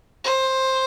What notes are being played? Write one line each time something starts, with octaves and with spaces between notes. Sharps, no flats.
C5